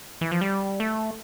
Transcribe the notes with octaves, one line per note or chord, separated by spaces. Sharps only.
E3
F3
G3
A3